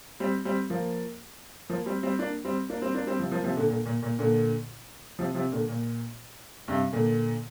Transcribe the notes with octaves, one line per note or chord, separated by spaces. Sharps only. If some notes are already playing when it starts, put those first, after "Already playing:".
G3 C4
G3 C4
F3 A#3
F3 A#3
G3 C4
G3 C4
A#3 D4
G3 C4
A#3 D4
G3 C4
A#3 D4
G3 C4
C3 F3
F3 A#3
C3 F3
A#2 D3
A#2 D3
A#2
A#2
A#2 D3
C3 F3
C3 F3
A#2 D3
A#2
G2 C3
A#2 D3